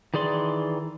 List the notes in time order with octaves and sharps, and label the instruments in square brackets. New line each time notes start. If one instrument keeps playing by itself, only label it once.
[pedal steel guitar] D#3 E3 G#4 D5 C6